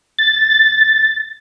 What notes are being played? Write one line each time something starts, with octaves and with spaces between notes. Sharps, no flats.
A6